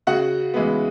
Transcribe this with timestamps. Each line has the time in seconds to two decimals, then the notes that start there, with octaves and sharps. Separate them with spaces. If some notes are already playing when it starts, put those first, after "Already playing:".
0.07 C#3 F#4 F#5
0.54 E3 G#3 B3